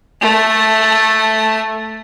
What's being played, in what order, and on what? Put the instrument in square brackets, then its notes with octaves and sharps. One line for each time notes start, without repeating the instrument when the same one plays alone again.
[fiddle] A3 A5